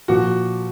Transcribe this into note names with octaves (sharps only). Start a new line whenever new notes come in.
A#2 F3 F#4